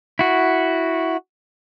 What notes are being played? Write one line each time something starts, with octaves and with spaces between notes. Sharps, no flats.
E4 F#4